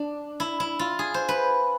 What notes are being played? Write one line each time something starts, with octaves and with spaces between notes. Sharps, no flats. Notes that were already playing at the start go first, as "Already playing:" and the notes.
Already playing: D4
E4
E4
F4
G#4
C5
B4